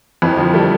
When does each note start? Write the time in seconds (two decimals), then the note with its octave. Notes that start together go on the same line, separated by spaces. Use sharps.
0.22 F2 E3
0.37 D3 F3
0.54 G3 A3